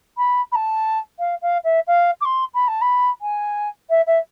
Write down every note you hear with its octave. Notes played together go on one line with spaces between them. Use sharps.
B5
B5
A5
F5
F5
E5
F5
D6
C6
B5
A5
B5
G#5
E5
E5